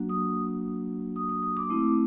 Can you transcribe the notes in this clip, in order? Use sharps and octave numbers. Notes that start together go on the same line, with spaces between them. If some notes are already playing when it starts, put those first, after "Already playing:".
Already playing: F#3 A#3 D4 F#4
D#6
D#6
D#6
D#6
D6
A3 C4 E4